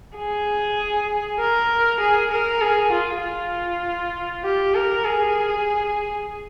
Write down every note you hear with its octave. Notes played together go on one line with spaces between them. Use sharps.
G#4
A#4
G#4
A#4
G#4
F4
F4
G4
A#4
G#4